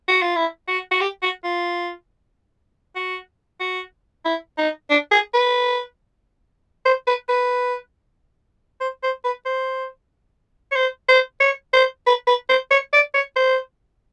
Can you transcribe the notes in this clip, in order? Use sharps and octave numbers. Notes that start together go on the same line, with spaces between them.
F#4
F4
E4
F#4
F#4
G4
F#4
F4
F#4
F#4
E4
D#4
D4
G#4
B4
C5
B4
B4
C5
C5
B4
C5
C#5
C5
C5
C#5
C5
B4
B4
C5
C#5
D5
C#5
C5